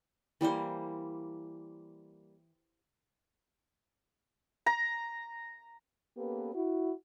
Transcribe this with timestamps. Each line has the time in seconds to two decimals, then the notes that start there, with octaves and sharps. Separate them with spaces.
0.41 E3 G3 A#3 C5
4.66 A#5
6.17 A#3 B3 C#4 G4 A4 B4
6.55 E4 F#4